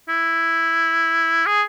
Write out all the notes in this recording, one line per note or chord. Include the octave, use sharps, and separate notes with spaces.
E4
G#4